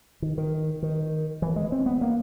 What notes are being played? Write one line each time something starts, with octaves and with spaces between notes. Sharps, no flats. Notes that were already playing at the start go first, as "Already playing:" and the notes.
D#3
D#3
D#3
E3
G#3
C4
B3
A#3